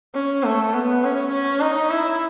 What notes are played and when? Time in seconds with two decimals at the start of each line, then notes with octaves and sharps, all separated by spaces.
0.15 C#4
0.44 A3
0.74 B3
1.03 C#4
1.32 C#4
1.61 D#4
1.90 E4